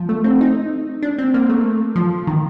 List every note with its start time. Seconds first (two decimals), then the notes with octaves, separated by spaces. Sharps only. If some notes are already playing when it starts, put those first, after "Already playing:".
Already playing: F3
0.09 A3
0.24 C4
0.41 D#4
1.03 D4
1.19 C4
1.34 A#3
1.49 A3
1.96 F3
2.27 D#3